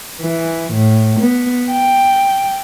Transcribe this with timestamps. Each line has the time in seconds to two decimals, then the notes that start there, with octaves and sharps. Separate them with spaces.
0.21 E3
0.73 A2
1.20 B3
1.72 G5